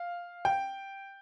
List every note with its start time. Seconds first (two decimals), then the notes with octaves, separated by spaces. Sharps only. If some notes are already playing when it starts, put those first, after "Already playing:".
Already playing: F5
0.45 G5